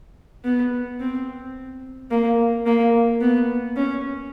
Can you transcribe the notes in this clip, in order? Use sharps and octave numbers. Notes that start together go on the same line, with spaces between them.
B3
C4
A#3
A#3
B3
C#4